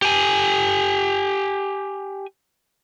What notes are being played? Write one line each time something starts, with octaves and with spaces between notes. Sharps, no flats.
G4 G#5